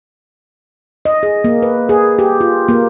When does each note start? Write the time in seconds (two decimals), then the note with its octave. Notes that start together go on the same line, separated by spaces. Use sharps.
1.05 D#5
1.23 G#4
1.44 A#3
1.62 B4
1.89 G#4
2.19 G4
2.41 F4
2.68 A#3